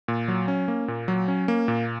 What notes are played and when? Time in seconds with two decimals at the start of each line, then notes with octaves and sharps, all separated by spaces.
0.08 A#2
0.28 F#3
0.48 C#4
0.68 A#3
0.88 A#2
1.08 F#3
1.28 C#4
1.48 A#3
1.68 A#2